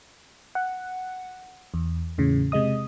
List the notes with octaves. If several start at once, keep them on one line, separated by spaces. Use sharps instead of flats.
F#5
E2
E2 A2 C#3
C3 G#3 D#5 D#6